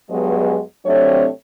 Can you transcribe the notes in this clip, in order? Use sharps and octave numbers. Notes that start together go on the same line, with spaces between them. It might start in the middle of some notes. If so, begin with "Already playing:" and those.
G2 F#3 G#3 B3 G#4 D#5
C3 F#3 A3 C4 D4 C#5